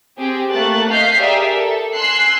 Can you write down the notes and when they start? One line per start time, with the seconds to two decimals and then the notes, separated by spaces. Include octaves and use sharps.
0.18 C4 G4 G#4
0.51 A3 A#3 F#6 A6
0.90 D#5 F5 G6 B6 C7
1.21 G4 G#4 A#4 D5 E5
1.55 A4
1.95 G#5 C6 E6 F#6 C7